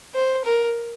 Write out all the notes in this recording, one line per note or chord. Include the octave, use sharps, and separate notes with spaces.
C5
A#4